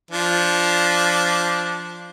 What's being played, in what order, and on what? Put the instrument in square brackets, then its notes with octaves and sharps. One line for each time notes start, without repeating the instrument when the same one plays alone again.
[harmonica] F3 D4